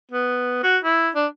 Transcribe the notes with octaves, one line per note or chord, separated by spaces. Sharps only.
B3
F#4
E4
D4